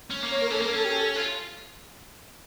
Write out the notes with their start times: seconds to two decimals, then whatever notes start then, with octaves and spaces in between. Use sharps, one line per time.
0.10 C#4
0.22 A#3
0.31 C#5
0.41 A#4
0.50 C#4 A4
0.61 A#3 A#4
0.72 C#4 A4
0.85 G4
0.95 A4
1.16 F4